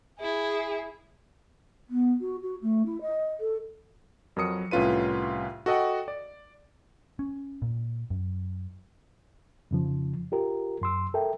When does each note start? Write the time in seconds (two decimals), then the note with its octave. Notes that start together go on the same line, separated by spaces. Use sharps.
0.20 E4 G#4
1.90 B3
2.21 F#4
2.43 F#4
2.62 A3
2.86 E4
3.01 D#5
3.40 A4
4.36 F2 F#3 A#4 D#6 C#7
4.71 C2 A2 C#4 F4 B4 D#7
5.66 F#4 A4 D#5 F#5 G5
6.08 D5
7.19 C#4
7.62 A#2
8.10 F#2
9.71 F2 C#3 F3
10.32 F4 G4 A#4
10.81 F#2 C6 E6
11.14 A4 A#4 E5 G5